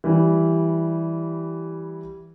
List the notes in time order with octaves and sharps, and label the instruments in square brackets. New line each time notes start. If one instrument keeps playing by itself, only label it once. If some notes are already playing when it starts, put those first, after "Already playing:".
[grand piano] E3 G3